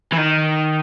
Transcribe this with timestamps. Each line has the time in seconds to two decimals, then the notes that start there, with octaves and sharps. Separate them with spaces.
0.13 E3
0.18 D#3